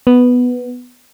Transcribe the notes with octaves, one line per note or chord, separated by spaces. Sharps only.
B3